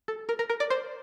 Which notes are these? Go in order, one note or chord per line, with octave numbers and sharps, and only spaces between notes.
A4
A#4
A#4
A#4
D5
C5